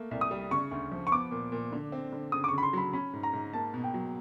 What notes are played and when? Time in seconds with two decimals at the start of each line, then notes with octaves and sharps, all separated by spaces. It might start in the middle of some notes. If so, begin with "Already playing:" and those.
Already playing: A3 A#3
0.11 C2
0.21 D#6
0.31 G3
0.51 C#3 C#6
0.71 D2
0.92 F3
1.07 C#6
1.12 B3 D6
1.31 A#2
1.52 A#2
1.72 D3
1.92 C4
2.13 D3
2.32 C#3 D#6
2.44 D6
2.48 C#3 C#6
2.58 B5
2.63 C6
2.73 F#3 B5
2.93 C#4 B5
3.13 G#2
3.23 A#5
3.33 G#2
3.53 A#3 A5
3.74 B2
3.84 G5
3.94 F#3